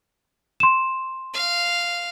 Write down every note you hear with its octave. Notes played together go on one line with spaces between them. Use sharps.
C6 E7
F5